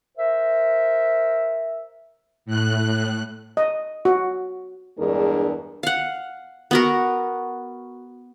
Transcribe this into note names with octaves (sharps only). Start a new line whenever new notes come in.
A#4 C5 E5
A2 F#6
D#5
F#4
E2 G2 G#3 D4 G#4 A#4
F5 F#5
B3 F#4 A#4